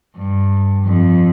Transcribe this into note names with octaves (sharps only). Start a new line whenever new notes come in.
G2
F2